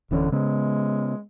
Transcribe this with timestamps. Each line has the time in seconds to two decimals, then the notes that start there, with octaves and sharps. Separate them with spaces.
0.11 D1 D3 E3 C#4
0.32 C#3 G#3 B3